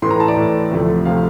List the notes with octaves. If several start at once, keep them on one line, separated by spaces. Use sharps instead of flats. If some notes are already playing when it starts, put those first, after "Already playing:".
A2 E3 A3 C6
A#5
A5
D5
A2 E3 A3
D2 C3 F3 A3
C3 F3 A3 F5